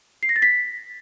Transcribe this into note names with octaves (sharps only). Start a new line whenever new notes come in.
C7
A#6
A6
B6